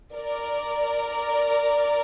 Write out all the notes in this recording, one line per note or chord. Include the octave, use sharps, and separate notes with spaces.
A#4 D5